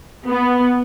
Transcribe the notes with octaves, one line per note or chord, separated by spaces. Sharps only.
B3